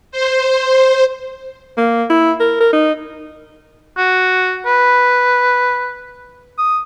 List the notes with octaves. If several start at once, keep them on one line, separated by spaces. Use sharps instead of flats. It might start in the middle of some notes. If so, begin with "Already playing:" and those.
C5
A#3
E4
A#4
A#4
D#4
F#4
B4
D#6